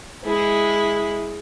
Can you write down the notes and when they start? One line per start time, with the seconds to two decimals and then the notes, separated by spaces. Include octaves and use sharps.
0.24 G#3 E4